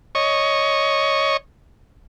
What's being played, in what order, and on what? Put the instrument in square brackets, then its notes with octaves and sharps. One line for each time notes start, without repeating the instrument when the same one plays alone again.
[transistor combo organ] C#5 D#5 C#6